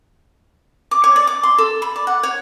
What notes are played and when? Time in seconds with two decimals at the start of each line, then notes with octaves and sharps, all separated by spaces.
0.91 D6
1.04 C#5
1.16 D5
1.27 D6
1.43 C6
1.58 A4
1.82 B5
1.96 D5
2.07 F#5
2.23 C#5